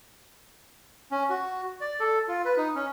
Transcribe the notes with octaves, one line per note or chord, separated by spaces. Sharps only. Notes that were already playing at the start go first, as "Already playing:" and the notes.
C#4
F#4
D5
A4
F4
B4
D#4
C#4